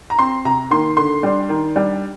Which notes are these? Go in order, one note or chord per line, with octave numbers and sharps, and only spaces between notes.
A#5
C4 C6
C3 A#5
D#3 A#3 C6
D3 C6
G3 D4
D#3
G3 D4